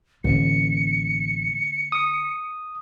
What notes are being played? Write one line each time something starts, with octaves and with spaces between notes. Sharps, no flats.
A1 D3 A#3 C#7
D#6